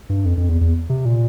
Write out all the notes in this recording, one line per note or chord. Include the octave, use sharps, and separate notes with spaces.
G2
F2
F2
E2
E2
C3
A#2